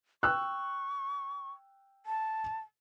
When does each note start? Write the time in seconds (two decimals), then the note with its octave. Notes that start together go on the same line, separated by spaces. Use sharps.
0.23 G5 C#6 E6 F#6
2.06 A5